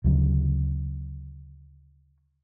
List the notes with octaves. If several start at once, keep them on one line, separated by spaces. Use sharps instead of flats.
D2 C#3 F#3